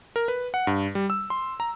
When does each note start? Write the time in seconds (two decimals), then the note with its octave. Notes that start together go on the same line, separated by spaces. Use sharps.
0.16 A#4
0.28 B4
0.54 F#5
0.67 G2
0.95 G3
1.10 E6
1.30 C6
1.60 A#5